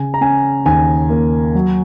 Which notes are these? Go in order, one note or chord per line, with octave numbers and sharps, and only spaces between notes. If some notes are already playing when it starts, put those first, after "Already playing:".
Already playing: C#3 G#5
A#5
C#4 G#5
D#2 G#5
A#3
F#3